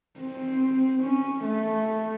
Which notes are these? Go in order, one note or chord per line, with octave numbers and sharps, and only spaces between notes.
C4
C#4
A3